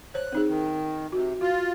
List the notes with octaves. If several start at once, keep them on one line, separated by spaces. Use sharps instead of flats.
C5 C#5 F#6
C4 D#4 G#4
D#3
C3 F#4
F4 F#4